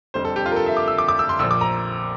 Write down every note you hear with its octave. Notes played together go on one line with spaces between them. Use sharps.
F1 F2 D3 G3 C5
A4
G4
F4
A#4
A4
E5
D6
E6
D6
D6
E6
C6
A#1 A#2 F3 E6
D6
A#5